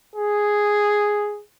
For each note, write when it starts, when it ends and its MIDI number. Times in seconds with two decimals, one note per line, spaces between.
0.16 1.42 68